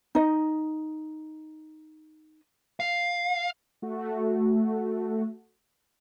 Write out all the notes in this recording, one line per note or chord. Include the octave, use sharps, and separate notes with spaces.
D#4 D#5
F5
A3 F#4